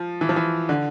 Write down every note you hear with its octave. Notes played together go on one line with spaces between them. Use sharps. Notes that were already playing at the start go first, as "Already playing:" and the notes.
Already playing: F3
E3
F3
E3
D3